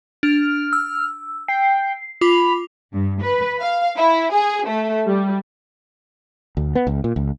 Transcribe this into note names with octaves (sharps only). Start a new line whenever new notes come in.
D4 F6
E6
G5 C7
F4 B5 D6 F7
G2
B4
F5
E4
G#4
A3
G3
D2
B3
C#2
A#2
C#2